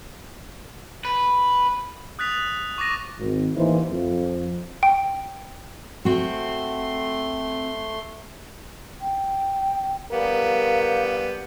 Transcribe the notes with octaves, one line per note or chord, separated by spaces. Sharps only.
B4
D#6 F#6 A6 B6 F7
C#6 D6 A6 A#6 D#7
G#1
A1 E3 A#3 D#4 E4 C5
F2 F3
G5
A3 C4 F#4 C6
G5
G3 B3 A#4 F5